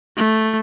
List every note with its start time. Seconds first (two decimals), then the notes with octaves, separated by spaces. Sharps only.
0.17 A3